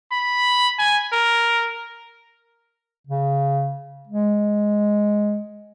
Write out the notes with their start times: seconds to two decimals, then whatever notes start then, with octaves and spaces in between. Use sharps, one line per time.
0.12 B5
0.79 G#5
1.12 A#4
3.07 C#3
4.07 G#3